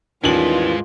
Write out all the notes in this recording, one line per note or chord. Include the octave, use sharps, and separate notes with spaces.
D#2 G#2 E3 G3 G#3 C#4 F4 F#7